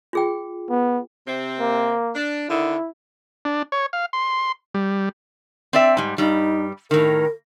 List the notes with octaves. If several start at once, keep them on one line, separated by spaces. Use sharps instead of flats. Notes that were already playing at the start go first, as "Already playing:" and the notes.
F4 G#4 G5
B3
C3 C4
A#3
D4
D3 D#3 E4
D4
C#5
F5
C6
G3
C4 D5 E5
G#2 G3
G2 G3 D#4
A2 D#3 A#4